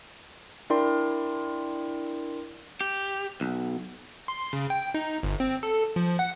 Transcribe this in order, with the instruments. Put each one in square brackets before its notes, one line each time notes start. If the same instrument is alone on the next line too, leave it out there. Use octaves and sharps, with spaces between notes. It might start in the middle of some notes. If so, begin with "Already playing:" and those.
[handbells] D4 E4 A#4 D5 G5 C6
[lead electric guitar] G4
B1
[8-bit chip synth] C6
C#3
G5
D#4
G1
C4
A4
F3
F#5